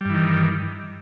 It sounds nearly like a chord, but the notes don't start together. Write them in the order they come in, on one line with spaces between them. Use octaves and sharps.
G3 G2 E3 D#3